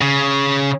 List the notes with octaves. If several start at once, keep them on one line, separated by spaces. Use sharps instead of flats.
C#3